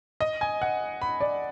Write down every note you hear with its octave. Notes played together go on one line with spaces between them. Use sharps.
D#5
G#5
F#5
B5
D5